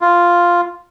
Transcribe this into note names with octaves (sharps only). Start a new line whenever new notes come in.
F4